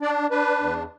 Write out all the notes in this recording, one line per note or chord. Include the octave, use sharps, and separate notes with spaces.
D4 D5
D4 B4
E2